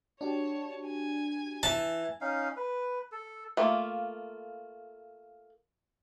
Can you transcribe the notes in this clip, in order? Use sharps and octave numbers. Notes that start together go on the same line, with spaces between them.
D4 F#4 G4 C#5 A5
G#5
E3 A5
C#4 D#4 F5
B4
A4
A3 A#3 F4